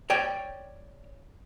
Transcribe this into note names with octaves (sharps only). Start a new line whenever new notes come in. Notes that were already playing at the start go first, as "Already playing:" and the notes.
C#5 D5 G5